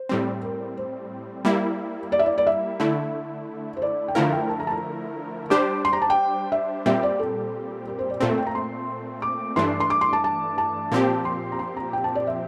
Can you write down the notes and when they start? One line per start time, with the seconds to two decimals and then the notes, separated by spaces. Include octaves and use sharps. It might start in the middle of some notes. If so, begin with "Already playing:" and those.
Already playing: C5
0.09 A2 G3 C4
0.43 A#4
0.77 C5
1.45 G3 A#3 E4
2.12 D5
2.19 E5
2.26 D5
2.38 D5
2.47 E5
2.80 D3 A3 E4
3.77 C5
3.82 D5
4.08 G5
4.15 D3 F3 A3 E4 A#4 F5
4.33 G5
4.49 A5
4.60 A#5
4.67 A5
4.71 A#5
5.50 G3 D4 G4 C5 D6
5.85 C6
5.93 A#5
6.02 A5
6.10 G5
6.52 E5
6.86 A#2 G3 C4 G4 E5
7.03 D5
7.19 A4
7.87 A#4
7.99 C5
8.10 D5
8.21 A#2 A3 C4
8.29 A4
8.38 G5
8.47 A#5
8.55 C6
9.22 D6
9.56 G2 E3 A3 D4 C6
9.80 C6
9.90 D6
10.01 C6
10.13 A5
10.24 A5
10.58 A5
10.92 A#2 F3 C4 G4
11.25 C6
11.52 A#5
11.59 C6
11.77 A#5
11.93 G5
12.04 A5
12.15 D5
12.27 E5